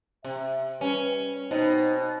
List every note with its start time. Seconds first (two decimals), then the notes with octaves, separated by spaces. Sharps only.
0.25 C3 E5
0.81 G3 C#4 B4
1.51 B2 C4 D#4